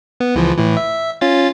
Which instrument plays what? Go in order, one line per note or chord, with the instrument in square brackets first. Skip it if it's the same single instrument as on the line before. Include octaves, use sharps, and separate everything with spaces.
[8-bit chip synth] B3
C#2 E3 F3
A2 E3
E5
C#4 F4 A6